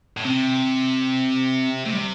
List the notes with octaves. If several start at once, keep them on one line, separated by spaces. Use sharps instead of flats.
A2
C3 C4
C3 A3
G3